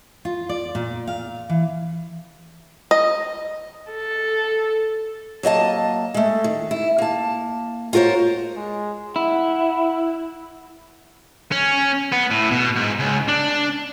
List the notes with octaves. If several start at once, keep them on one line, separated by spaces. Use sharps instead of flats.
F4
D5
A#2
F5
E3
D#5
A4
F#3 A#3 D#5 A5
G#3 A3
D#3
E4
A#3 A5
F4 F#4 A#4 C5 C#5
G#3
E4 F#5
C#4
B3
A2
B2
G#2
C#2
D4